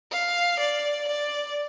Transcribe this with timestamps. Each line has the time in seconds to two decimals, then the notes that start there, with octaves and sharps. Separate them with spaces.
0.12 F5
0.59 D5
1.08 D5